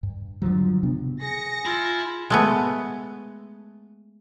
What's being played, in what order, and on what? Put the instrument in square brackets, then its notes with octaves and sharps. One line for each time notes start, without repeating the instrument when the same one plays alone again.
[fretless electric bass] G2
G2 D3 F3 F#3
C3 B3 D4
[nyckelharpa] G#4 [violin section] A#6 C#7
[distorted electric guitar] E4 [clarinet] F4
[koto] G#3 A3 B3